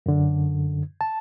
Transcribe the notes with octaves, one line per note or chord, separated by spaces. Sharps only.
F#2 D3
A5